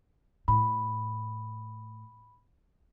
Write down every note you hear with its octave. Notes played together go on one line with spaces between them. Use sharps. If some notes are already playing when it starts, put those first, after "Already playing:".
A2 B5